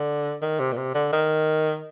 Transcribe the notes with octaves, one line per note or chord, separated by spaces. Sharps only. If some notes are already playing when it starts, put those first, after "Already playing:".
Already playing: D3
D#3
C3
A#2
C3
D3
D#3